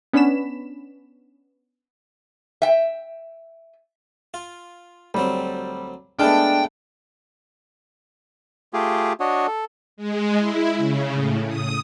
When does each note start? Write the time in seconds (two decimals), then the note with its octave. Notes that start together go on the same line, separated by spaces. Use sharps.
0.13 B3 C#4 D4 B5 B6 E7
2.62 E5 G5
4.34 F4
5.14 D2 F#3 G3 C4
6.20 G#3 A3 B3 D4 G5 A5 F6
8.73 A3 F4 G4 G#4
9.20 D4 F#4 C#5 D#5
9.47 A4
9.97 G#3
10.38 E4
10.77 C#3
11.13 A2
11.48 D#6